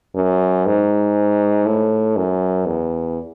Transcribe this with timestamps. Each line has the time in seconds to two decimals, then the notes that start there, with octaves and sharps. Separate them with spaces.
0.15 F#2
0.66 G#2
1.66 A2
2.16 F#2
2.66 E2